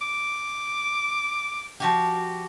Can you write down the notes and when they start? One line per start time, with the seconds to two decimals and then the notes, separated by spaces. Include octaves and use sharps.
0.01 D6
1.80 F3 F#4 G4